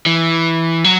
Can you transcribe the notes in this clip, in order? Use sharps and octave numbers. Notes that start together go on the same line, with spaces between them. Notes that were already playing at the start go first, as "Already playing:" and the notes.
E3
F#3